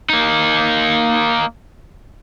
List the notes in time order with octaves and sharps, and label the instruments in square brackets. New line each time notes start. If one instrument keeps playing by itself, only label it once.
[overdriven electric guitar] A#3 D#4